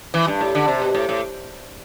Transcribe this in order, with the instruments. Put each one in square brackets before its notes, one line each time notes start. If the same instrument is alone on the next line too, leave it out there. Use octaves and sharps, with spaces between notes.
[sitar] E3
G2
A2
D3
C3
B2
A2
A2